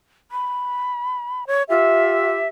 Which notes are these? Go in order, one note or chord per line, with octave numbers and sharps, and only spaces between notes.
B5
C#5
F4 G4 E5